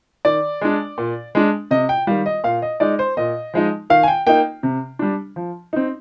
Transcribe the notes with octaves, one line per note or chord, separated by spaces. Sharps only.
D#3 D5
G#3 D4
A#2
G#3 D4
C3 D#5
G5
D#3 G3 F5
D#5
A#2 F5
D#5
G#3 D#4 D5
C5
A#2 D#5
F3 G#3 D#4
D#3 F5
G#5
G5
A#3 D#4 G5
C3
G3 D4
F3
C4 D#4